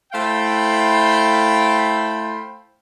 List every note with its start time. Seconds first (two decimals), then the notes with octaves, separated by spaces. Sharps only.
0.13 A3 E4 C5 F5 G5 B5